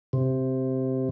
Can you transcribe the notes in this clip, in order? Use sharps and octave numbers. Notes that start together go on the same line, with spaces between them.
C3